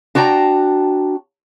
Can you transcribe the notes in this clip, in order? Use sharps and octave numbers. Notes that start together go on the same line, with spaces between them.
D4 F#4 G5 A5 A#5